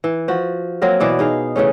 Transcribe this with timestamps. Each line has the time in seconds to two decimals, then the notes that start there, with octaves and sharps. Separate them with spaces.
0.04 E3
0.28 F3 F#4
0.82 F#3 A#3 C4 A#4
1.00 B2 E3 D5
1.19 D#4 G#4 F5
1.56 C#3 E3 A3 C#4